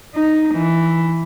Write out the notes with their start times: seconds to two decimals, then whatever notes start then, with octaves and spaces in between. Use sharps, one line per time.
0.15 D#4
0.55 E3